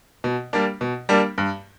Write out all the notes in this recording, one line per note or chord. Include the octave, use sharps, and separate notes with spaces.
B2
G3 A#3 D4
B2
G3 A#3 D4
G2